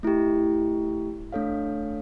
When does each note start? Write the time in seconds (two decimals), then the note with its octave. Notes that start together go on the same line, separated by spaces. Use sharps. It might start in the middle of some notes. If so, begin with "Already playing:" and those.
0.03 A3 E4 G4
1.32 A3 D4 A4 C#5 F5